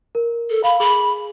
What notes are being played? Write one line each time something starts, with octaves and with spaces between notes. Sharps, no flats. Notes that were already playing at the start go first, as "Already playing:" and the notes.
A#4
A4
F5 B5
G#4 B5